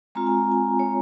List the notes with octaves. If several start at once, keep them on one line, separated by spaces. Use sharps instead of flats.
G#3 C4 F4 A#5
G#5
G#5
C#5